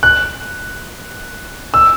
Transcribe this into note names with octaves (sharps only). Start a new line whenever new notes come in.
F#6
E6